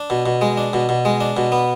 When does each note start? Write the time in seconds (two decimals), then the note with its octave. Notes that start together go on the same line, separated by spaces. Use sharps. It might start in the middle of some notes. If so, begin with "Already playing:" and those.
Already playing: D4
0.10 B2
0.26 B2
0.41 G#3
0.57 D4
0.73 B2
0.89 B2
1.05 G#3
1.21 D4
1.37 B2
1.52 B3